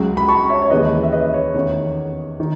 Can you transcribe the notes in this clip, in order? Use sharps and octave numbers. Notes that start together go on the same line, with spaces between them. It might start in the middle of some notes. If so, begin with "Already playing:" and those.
Already playing: C#2 C#3 F#3
B5
A5 C#6
C#5 E5
C#5
D#2 C#3 E3 G#3 C#4 B4 D#5
E5
B4 D#5
C#5
E2 D#3 A3 C#4 C#5
D#3